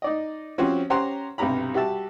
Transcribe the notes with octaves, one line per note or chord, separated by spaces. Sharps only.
D#4 D5 D#5
F3 C4 C#4 F#4 G4 C5
C#4 G4 C5 F#5 A#5 C6
B1 G2 C3 G4 A#5 B5
G3 F#4 G4 E5 A5